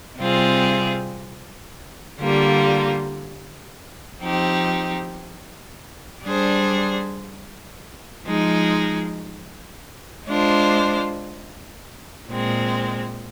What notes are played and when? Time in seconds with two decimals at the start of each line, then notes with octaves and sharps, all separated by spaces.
0.17 C3 G3 C4 F4 G#4
2.19 D3 G3 A#3 F4
4.21 F3 C4 D#4 G4
6.23 G3 D4 G#4 C5
8.25 F3 G#3 D#4
10.27 G#3 D4 F4 C5
12.29 A#2 G#3 C4